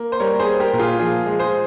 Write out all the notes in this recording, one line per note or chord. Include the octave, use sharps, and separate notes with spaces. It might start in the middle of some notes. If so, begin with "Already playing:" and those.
Already playing: A#3
C5
G3 A#4 C#5
G#4 C5
A#3
G4 A#4
A#2 A#4
F4 G#4
F3 F4 G#4
G#3
G#4 C5